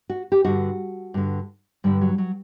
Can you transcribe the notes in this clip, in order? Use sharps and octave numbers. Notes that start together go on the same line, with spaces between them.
F#4
G4
G2 D3 F#4
G2 D3
G2 D3 G3
F#3
F#3